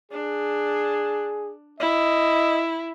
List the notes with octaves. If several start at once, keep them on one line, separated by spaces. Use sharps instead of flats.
D4 G#4
E4 D#5